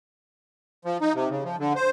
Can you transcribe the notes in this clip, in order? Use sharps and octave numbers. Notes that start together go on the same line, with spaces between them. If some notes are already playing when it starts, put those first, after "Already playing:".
F3
D#4
C3
C#3
F3
D3
C5